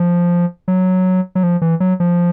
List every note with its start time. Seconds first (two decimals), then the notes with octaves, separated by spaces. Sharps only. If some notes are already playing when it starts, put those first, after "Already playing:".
Already playing: F3
0.68 F#3
1.35 F#3
1.43 F3
1.62 E3
1.80 F#3
2.00 F3